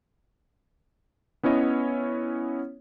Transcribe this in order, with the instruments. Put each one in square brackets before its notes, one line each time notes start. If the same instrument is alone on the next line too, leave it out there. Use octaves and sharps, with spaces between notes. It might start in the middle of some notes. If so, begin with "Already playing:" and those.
[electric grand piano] B3 C#4 E4 C#5 D#5